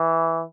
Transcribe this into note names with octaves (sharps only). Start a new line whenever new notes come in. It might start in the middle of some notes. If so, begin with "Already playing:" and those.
Already playing: E3